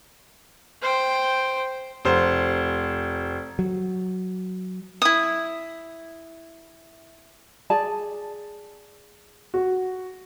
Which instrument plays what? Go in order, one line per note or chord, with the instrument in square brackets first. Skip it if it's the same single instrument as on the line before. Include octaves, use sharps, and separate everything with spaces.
[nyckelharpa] C5 G5
[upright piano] F1 C5
[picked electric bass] F#3
[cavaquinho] E4 D#6
[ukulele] G#4 D5 A5
[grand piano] F#4